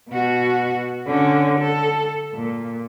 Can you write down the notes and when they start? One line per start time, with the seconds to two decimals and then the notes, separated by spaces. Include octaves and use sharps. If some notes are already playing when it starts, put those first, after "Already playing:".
0.10 B2 F#4
1.07 D3 C#4
1.60 A4
2.34 A#2